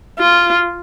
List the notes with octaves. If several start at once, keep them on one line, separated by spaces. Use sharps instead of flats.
F4